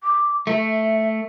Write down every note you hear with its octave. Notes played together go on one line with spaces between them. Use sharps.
D6
A3 E5